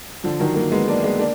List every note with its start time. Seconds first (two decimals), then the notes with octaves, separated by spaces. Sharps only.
0.24 D3 F3
0.39 D#3 F#3
0.55 F#3 A#3
0.72 G#3 B3
0.88 A#3 D4
1.04 G#3 B3
1.19 A#3 D4